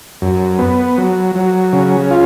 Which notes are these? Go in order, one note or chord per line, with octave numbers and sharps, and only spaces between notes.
F#2
B3
F#3
F#3
C#3
F4